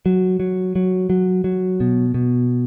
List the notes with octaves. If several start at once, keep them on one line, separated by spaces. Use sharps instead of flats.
F#3
F#3
F#3
F#3
F#3
B2
B2